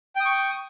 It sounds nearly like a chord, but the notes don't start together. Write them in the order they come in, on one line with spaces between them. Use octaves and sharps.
G5 D#6 C#6